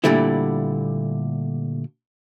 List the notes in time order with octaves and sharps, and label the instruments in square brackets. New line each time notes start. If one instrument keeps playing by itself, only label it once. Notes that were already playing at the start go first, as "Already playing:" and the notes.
[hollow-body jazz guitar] A#2 D3 G3 A3 E4